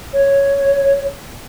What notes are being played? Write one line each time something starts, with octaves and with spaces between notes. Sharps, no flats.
C#5